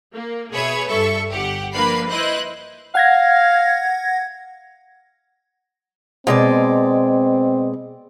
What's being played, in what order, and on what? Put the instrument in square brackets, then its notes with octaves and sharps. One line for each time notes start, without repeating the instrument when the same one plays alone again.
[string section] A#3
B2 G#4 B4 C#5 E5 G#6
G2 A4 E5 C#6
G1 G4 F#5
F3 A#3 D4 B4 B5 C7
E4 B4 C5 D#5 F#6
[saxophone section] F5 [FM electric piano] F#5 G#6 A#6
[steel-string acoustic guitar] B2 G#3 D5 [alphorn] C4